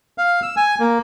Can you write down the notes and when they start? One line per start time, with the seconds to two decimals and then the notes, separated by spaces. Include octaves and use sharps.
0.18 F5
0.43 E6
0.56 G#5
0.80 A#3